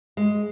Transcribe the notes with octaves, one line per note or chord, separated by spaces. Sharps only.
G#3